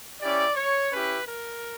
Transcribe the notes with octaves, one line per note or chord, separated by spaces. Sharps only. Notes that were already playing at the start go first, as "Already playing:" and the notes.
C#4 E4 G4 D5
C#5
C#4 E4 G4 B4
A#4